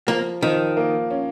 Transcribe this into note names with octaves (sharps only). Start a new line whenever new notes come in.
F3 A#3
D#3 F3
A#3
C#4